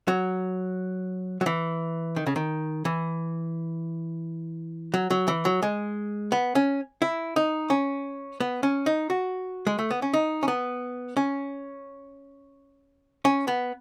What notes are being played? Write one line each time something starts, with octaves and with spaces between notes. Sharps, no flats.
F#3
F#3
E3
D#3
C#3
D#3
E3
F#3
F#3
E3
F#3
G#3
B3
C#4
E4
D#4
C#4
B3
C#4
D#4
F#4
G#3
A3
B3
C#4
D#4
C#4
B3
C#4
C#4
B3